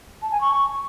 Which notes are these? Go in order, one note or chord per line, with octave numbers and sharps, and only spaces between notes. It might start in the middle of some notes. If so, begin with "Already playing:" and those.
A5
G#5
C#6